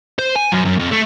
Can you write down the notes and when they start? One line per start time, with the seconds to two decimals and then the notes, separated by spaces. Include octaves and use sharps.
0.19 C5
0.35 G#5
0.52 F#2
0.65 F#2
0.79 F2
0.91 A3